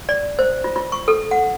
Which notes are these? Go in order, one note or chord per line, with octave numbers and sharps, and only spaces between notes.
D5
C5
F4
F4
C#6
A4
F#5